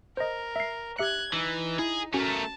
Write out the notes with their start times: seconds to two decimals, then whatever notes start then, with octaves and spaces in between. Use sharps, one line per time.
0.17 A#4 C5 D#5
0.56 E5 C7
0.99 G4 E5 F#6 G#6 C#7
1.33 E3 D#4
1.79 E4 G#4
2.14 A3 C#4 F#4 A#4 G#5 A5